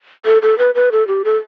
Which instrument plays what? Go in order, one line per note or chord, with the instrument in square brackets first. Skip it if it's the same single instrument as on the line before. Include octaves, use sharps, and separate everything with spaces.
[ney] A4
A4
B4
B4
A4
G4
A4